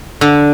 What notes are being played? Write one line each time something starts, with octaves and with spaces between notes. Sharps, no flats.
D3